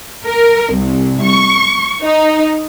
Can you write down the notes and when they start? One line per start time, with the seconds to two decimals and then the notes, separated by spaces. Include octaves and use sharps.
0.25 A#4
0.74 C2
1.23 C#6
2.04 D#4